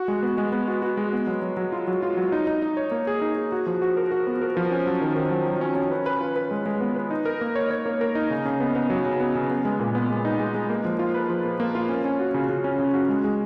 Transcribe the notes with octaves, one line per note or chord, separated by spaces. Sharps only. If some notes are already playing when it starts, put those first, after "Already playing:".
Already playing: F#4
G#3
B3
G#3
B3
F#4
F#4
G#3
B3
F#3
F#3
F#3
F4
F#3
F4
F#3
D#4
D#4
D#4
C#5
A#3
G#4
D#4
G#4
F#4
F3
F#4
A#4
F#4
B3
A#4
F3
C#4
F#3
D#3
D#3
F#3
F#3
C#4
C#4
B4
B4
F4
B4
G#3
G#3
B3
B4
D#4
A#4
A#3
C#5
C#5
A#3
A#4
D#4
C#3
C#3
B3
B3
F#3
C#3
B3
C#3
B3
G#3
A#2
B3
G#3
D#4
G#3
G#3
A#3
F3
F4
B4
F3
A#3
A#3
F4
C#4
C#4
F#4
C#3
C#3
C#4
C#3
F#4
G#3
G#3